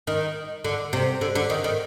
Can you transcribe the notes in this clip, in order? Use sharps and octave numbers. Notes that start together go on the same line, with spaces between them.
D#3
D3
C3
D3
D3
D#3
D#3